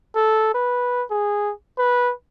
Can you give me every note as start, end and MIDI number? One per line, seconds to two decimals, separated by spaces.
0.15 0.50 69
0.54 1.03 71
1.10 1.52 68
1.78 2.13 71